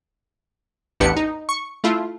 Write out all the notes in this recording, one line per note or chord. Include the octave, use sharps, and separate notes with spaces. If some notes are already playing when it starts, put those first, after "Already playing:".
A1 E2 D4 G4 B4 C#7
D#4
C#6
A3 E4 F4